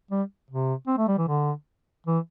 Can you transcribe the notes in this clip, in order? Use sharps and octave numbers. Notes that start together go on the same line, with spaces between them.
G3
C3
C4
A3
G3
E3
D3
E3